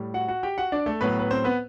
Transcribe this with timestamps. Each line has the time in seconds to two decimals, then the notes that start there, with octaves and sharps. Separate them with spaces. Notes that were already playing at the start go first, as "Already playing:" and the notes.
Already playing: A2 G3
0.14 F#4 F#5
0.28 F#4 F#5
0.43 G4 G5
0.58 F#4 F#5
0.72 D4 D5
0.86 A3 A4
1.01 A2 F#3 B3 B4
1.19 B4
1.31 C4 C5
1.44 B3 B4